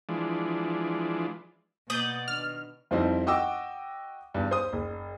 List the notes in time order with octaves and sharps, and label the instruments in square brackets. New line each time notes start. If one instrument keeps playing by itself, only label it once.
[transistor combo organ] E3 F3 G#3 D4
[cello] B2 [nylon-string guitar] A#3 A5 [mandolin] D5 [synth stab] D#6 G6
[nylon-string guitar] D#3 D4 [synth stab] F6
[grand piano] F2 F3 G3 C4 D#4 E4
F#4 D#5 G5 D6 E6
E2 G2
C5 D#6
F#1